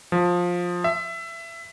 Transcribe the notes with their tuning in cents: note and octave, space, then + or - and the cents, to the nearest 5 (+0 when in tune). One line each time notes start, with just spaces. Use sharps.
F3 +15
E5 +20